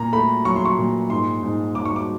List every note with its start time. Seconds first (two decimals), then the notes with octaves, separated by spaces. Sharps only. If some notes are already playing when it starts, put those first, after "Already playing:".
Already playing: A#2 A#5
0.13 A3 B5
0.45 F#3 C#6
0.56 C6
0.65 C#6
0.78 A#2
1.10 G#2 C6
1.43 G#2
1.75 G#2 D6
1.85 C#6
1.96 D6